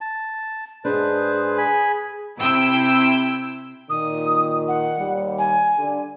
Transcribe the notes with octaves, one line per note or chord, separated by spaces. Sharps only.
A5
G#2 D4 G#4 B4 C5
G#5 B5
C3 E4 G5 E6
A#2 D#3 D#6
F#5
D#2 G3
G#5
D3 G3